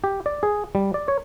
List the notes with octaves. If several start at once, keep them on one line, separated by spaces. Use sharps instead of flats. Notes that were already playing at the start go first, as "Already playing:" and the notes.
G4
D5
G#4
G3
D5
C#5